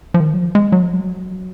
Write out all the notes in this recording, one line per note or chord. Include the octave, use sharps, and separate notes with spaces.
F3
D#3
F#3
F3
G#3
F#3
F3
F#3